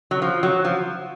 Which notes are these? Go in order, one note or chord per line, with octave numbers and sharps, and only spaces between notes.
F#3
F3
F#3
F3